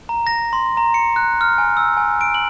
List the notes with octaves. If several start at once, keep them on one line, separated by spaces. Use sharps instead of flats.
A#5
A#6
C6
A#5
C#7
F#6
F6
G#5
E6
G#5
D7
F#7